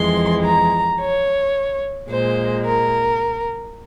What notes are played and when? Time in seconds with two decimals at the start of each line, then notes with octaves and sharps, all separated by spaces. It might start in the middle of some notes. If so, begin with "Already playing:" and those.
Already playing: F2 E3 G#3 C6
0.44 A#5
1.00 C#5
2.10 A#2 G#3 C5
2.65 A#4